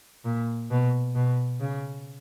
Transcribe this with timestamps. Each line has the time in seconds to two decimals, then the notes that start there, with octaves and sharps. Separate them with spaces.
0.24 A#2
0.70 B2
1.15 B2
1.60 C#3